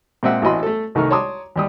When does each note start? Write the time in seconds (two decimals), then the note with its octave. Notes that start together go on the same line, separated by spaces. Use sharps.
0.23 A#2 G#3 C4 D#5 E5 F#5
0.42 A1 E3 F#4 D#5 B5 C6
0.63 A3 A4
0.95 C2 D#3 A3 D#4 C#6 F6
1.10 C#5 A5 A#5 C6 D6 D#6
1.56 D#2 G3 D#6